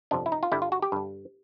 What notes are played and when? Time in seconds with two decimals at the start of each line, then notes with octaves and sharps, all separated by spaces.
0.11 G1 F2 C3 F3 D4
0.26 E4
0.32 D#4
0.43 F4
0.52 G2 D3 G3 E4
0.62 F4
0.72 F#4
0.82 G4
0.92 G2 D3 G3